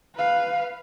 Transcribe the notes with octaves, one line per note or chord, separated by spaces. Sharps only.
B4 F5